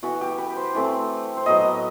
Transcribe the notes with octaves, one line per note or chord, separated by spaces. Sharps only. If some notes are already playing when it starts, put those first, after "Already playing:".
E3 B3 F#4
G4
B4
C5
E3 A3 C4
C5
A2 F#3 B3 D#5